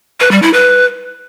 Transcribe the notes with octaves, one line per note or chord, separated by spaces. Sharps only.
B4
G3
E4
B4